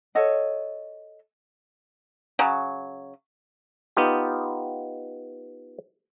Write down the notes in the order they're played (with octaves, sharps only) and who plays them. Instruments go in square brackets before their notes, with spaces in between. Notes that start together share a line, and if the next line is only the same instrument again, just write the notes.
[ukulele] A4 C#5 D#5 F#5
[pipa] C#3 F#3
[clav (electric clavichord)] B3 D#4 F4 G4